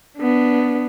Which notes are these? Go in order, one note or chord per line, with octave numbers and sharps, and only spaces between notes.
B3 D4